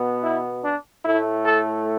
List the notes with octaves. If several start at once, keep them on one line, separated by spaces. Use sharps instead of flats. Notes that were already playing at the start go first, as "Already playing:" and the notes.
Already playing: B2 B3
E4
D4
A2 A3 E4
A4